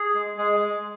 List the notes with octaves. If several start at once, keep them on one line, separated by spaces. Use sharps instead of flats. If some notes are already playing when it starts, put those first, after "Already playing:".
Already playing: G#4
G#3
G#3 G#4
G#3